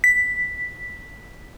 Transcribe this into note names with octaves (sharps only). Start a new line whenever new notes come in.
B6